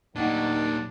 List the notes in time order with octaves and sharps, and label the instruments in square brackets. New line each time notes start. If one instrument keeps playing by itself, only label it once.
[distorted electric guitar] A#2 G3 [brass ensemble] D#3 F#3 [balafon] A3 D#4 F#5 [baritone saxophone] D4